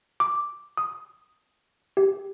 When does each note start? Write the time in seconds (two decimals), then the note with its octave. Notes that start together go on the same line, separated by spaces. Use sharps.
0.20 D6
0.77 D#6
1.97 G4